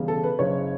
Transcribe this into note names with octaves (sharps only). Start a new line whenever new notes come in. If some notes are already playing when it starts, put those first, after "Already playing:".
Already playing: E1 E2 C#3 G3
A4
B4
F#1 F#2 C#3 C#5